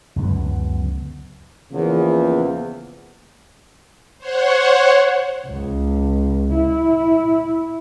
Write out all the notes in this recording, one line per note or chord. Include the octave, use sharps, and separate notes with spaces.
C#2 F#2 D3 B3
E2 C#3 F3 A#3
C5 C#5 F#5
C#2
E4